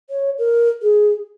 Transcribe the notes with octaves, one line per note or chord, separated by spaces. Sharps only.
C#5
A#4
G#4